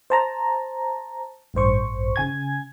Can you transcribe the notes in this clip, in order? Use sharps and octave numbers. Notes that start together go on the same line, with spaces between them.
C5 A5 A#5
A1 G2 C5 C#6
C#3 G#5 G#6